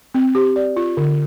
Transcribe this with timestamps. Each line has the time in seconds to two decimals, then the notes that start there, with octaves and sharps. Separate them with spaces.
0.14 C4
0.35 G4
0.56 D5
0.76 F4
0.97 D3